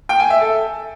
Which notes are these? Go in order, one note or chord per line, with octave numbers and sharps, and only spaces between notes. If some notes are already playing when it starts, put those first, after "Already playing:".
G5
G#5
E5
A4